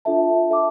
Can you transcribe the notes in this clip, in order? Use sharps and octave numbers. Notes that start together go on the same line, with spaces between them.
D4 F4 A4 E5 A5
A4 E5 A5 D6